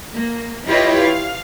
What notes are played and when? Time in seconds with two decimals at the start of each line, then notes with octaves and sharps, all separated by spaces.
0.13 A#3
0.67 E4 F4 G4 B4 C#5 D#5
1.00 F5